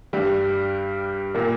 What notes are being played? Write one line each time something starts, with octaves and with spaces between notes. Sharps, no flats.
G2 G3
A#2 A#3